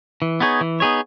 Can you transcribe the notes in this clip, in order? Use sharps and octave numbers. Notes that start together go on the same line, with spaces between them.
E3
B3 D#4 G#4 C#5
E3
B3 D#4 G#4 C#5